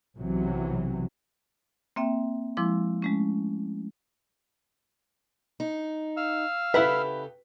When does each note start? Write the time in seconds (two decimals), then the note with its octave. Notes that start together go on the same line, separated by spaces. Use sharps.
0.20 B1 C3 E3 F#3
1.96 A#3 C4 E5 G5
2.57 F3 G#3 E4 C6 D6
3.02 G#3 A3 C#4
5.60 D#4
6.17 F5 E6 F6
6.74 C#3 E4 G4 A4 B4 F#5 B5